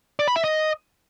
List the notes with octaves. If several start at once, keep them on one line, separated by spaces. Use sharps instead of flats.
D5
B5
E5
D#5